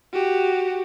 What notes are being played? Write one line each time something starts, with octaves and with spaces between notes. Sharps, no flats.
F#4 G4